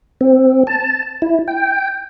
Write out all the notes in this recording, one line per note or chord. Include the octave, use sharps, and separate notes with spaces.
C4
A5
E4
G5